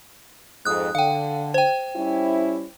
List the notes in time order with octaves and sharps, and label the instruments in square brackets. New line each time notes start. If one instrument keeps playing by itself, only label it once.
[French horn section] F2 G#2 [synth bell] D#6 F#6
[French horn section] D3 [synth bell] F5 G5
[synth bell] C5 G5
[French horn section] G3 C#4 E4